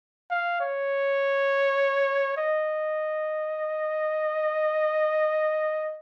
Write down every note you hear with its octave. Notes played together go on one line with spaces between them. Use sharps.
F5
C#5
D#5